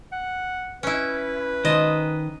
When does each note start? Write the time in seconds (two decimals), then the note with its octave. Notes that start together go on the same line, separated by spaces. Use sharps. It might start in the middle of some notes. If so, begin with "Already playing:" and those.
0.12 F#5
0.83 C#4 E4 B4
1.65 D#3 C5 D#5